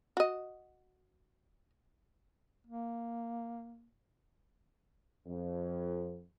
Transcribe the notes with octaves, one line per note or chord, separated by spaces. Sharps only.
F#4 D#5
A#3
F2